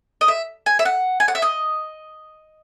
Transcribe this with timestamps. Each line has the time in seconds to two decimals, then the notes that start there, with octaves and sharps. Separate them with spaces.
0.21 D#5
0.28 E5
0.66 G#5
0.79 E5
0.85 F#5
1.20 G#5
1.28 F#5
1.35 E5
1.42 D#5